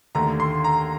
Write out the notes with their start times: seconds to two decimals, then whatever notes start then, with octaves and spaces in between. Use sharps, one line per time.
0.15 D#2 D3 A3 A#5
0.40 C6
0.64 A#5